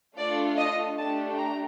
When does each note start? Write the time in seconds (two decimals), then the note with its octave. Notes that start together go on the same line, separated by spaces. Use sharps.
0.17 A3 D4 F4 A4 D5
0.57 D#5
0.97 A3 D4 G4 A5
1.37 A#5